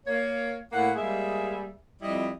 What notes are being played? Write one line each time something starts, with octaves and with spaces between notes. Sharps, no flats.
A#3 C#5
A2 A#3 E4 F#5
G3 G#3 A#3 G#4 E5
F2 G3 E4 D#5